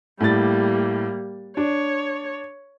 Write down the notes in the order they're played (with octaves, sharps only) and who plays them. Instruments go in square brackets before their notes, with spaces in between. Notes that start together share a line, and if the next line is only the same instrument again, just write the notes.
[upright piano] A2 A6 [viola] G3 A#3
[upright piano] D4 [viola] C#5